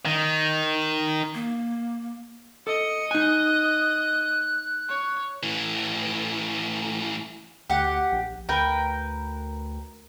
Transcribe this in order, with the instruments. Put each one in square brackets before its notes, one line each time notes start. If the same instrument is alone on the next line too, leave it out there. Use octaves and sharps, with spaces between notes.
[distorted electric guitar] D#3
[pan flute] A#3
[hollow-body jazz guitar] A4 [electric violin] D#5 [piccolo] C#7
[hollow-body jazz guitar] D#4 G#5 [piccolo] F#6
[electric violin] C#5
[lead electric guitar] A2 E3
[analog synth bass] D2 [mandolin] G4 F#5
[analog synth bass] A#1
[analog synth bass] D2 [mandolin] A#4 B4 G5